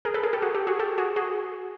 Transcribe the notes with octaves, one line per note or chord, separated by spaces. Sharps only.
G#4 A#4
A4 B4
G#4 A#4
G4 A4
F#4 G#4
G4 A4
F#4 G#4
G4 A4
F#4 G#4
F#4 G#4